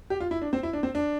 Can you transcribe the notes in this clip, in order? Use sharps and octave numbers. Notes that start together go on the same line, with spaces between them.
G4
F4
E4
D4
C4
E4
D4
C4
D4